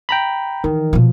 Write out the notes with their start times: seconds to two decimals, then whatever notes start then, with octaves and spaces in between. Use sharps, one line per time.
0.09 G5 A#5 B5
0.64 D#3 E3
0.93 B2 F3